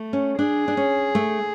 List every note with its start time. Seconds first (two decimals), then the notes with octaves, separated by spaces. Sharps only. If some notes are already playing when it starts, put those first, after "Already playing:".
Already playing: A3
0.13 C#4
0.38 D4 G#4
0.68 D4
0.77 C#4
1.15 A3